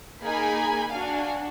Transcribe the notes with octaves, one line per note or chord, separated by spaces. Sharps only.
A#3 D#4 G#4 G#5 B5
D4 F#4 F5 G#5